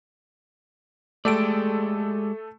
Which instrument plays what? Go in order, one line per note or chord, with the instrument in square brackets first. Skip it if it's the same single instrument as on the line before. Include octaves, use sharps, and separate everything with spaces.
[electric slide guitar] G#3 G4 D5 [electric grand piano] A3 A4 D7